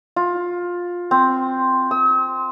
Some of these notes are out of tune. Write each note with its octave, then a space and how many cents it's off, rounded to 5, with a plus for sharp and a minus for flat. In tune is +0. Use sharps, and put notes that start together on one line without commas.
F4 +15
C4 +0
E6 -45